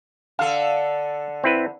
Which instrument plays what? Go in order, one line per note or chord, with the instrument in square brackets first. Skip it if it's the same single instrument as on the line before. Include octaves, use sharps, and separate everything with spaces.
[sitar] D3 A4 [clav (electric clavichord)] F5
[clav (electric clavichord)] C4 E4 B4